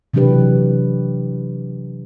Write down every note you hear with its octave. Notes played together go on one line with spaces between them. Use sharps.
C3 E3 F#3 D4 G4 B4